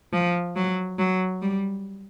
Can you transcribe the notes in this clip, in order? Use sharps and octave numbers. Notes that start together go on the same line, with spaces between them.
F3
F#3
F#3
G3